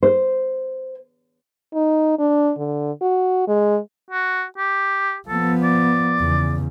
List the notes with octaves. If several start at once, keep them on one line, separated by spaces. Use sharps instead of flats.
C5
D#4
D4
D3
F#4
G#3
F#4
G4
F3 B3 A4
D5
E2 C#3